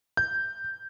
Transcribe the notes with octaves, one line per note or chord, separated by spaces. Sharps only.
G6